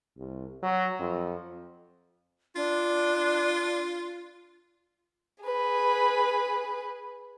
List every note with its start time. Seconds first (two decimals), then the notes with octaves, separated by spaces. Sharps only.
0.18 C2
0.63 F#3
0.99 F2
2.56 D4 F4
5.43 G#4 B4